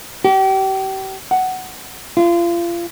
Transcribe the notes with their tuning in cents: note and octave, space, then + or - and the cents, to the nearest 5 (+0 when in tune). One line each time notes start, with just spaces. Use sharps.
G4 -35
F#5 +10
F4 -30